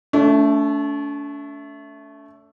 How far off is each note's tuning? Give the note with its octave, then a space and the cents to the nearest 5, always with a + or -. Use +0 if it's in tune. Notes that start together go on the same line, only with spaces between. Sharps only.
A3 +0 D4 -45